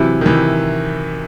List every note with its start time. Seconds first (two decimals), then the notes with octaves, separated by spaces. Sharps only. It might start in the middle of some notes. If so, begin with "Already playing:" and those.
Already playing: C3 E3 F#3 C4 E4 G4
0.21 D#3
0.26 C3 E3